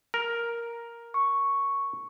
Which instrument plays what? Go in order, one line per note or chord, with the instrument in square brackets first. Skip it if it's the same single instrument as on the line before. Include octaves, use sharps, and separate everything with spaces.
[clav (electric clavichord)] A#4
[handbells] C#6